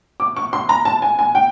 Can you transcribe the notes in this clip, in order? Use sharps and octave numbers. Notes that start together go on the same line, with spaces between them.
D6
C#6
C6
A#5
A5
G#5
G#5
G5